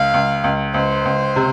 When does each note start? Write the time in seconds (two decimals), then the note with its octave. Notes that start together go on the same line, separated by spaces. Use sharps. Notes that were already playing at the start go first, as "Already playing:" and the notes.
Already playing: C#2 F5
0.14 C#2
0.44 C#2
0.74 C#2 C5
1.05 C#2
1.36 C3